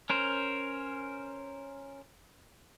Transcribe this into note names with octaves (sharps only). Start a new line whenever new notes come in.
C#4 A#4 C5